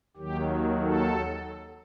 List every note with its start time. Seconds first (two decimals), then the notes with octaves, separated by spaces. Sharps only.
0.17 D#2 D#3 F#3 G4
0.83 A4